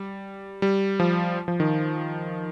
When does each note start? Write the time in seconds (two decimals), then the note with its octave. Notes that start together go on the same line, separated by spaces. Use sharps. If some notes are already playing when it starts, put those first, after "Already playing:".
Already playing: G3
0.62 G3
1.00 F3
1.48 F3
1.60 D#3